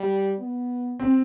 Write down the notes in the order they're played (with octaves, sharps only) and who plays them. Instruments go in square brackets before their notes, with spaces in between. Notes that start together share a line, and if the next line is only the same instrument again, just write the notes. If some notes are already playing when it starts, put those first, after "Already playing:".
Already playing: [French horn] G3
B3
[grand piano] C4